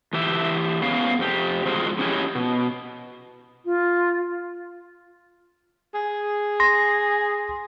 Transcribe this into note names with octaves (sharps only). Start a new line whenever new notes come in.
E3 G4 E5
B3 C#4 G#4 F5
F2 G4
F3 G#3 C4 F4 F#4 G#4
C#4 E4 G4 B4 C#5 D#5
B2
F4
G#4
C6 A#6